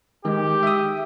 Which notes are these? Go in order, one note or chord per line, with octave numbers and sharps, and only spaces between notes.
D#3 G#3 G4
E5 D#6